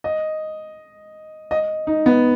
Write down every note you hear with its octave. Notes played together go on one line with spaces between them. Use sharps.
D#5
D#5
D#4
B3